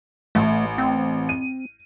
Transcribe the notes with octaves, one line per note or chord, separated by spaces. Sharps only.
A1 A3
C4
D#7